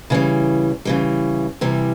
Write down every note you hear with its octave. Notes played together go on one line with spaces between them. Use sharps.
C#3 E3 G3
C#3 E3 G3
C3 E3 G3